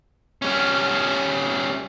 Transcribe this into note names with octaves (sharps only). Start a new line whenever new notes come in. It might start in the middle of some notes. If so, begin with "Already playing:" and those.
G3 C#4